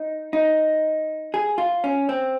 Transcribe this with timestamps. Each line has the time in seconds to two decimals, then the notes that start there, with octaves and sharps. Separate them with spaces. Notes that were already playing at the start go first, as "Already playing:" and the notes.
Already playing: D#4
0.33 D#4
1.34 G#4
1.58 F4
1.84 C#4
2.09 C4